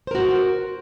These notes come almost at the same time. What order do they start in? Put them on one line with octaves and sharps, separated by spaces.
C5 A#4 F#4